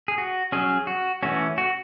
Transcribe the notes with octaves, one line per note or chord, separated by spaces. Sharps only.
G#4
F#4
F#3 C#4 G#4
F#4
E3 A3 C#4 F#4
F#4